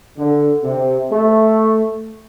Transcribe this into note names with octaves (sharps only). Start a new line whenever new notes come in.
D3
C3
A3